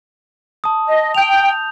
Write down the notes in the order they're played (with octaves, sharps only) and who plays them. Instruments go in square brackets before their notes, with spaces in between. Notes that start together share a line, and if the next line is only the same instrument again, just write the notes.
[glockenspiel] A5 D#6
[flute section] D#5
[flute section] G5 [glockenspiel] G6 F7